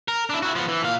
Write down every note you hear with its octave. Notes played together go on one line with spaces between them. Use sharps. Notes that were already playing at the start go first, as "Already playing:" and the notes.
A#4
D4 E4
E4 F#4
F3 B3
E3
A#2 F5